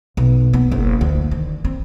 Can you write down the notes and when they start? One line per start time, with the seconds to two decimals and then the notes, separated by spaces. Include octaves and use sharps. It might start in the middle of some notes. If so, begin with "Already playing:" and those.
0.17 B1
0.53 B3
0.72 F#1
1.01 D2
1.31 D#3
1.65 C4